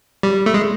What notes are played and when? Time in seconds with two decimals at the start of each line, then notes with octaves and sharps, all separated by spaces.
0.23 G3
0.46 A3
0.54 G#3